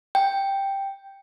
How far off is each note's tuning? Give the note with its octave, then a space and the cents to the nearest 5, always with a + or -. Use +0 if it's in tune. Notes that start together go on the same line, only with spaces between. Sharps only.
G5 +5